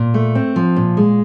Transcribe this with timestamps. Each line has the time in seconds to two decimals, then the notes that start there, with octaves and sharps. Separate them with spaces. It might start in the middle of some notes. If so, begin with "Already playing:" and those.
Already playing: A#2
0.14 A3
0.35 C4
0.56 F3
0.76 A#2
0.97 G#3